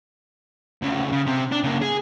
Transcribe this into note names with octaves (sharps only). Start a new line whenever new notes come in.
D2 C#3
C#3
C3 C4
D4
C#3 A#3
G#4